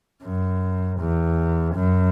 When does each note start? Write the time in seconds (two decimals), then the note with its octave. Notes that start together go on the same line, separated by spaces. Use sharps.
0.23 F#2
0.99 E2
1.75 F#2